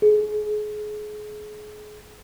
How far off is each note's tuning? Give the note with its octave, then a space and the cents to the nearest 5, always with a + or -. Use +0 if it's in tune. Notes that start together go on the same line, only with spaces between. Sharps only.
G#4 +30